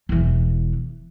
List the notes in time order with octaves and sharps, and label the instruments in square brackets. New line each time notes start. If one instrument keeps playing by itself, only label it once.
[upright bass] E1 E3